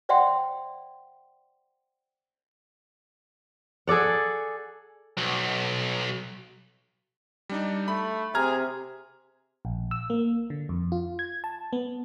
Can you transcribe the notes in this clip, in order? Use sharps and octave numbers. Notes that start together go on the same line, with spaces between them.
C5 D5 E5 F#5 G5 C6
G#4 A4 D5 F#5
B1
G3 D4 D#4
A3 B5
C3 G#4 A#5 F6 G#6
A#1
E6
A#3
D3
F2
F4
G#6
A5
B3